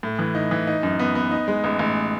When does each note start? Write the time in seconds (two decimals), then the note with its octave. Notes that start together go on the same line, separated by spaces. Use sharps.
0.03 A2
0.19 E3
0.35 D#4
0.51 E3
0.67 D#4
0.83 F#2
0.99 B3
1.15 B3
1.31 D#4
1.48 G#3
1.64 A1
1.79 A1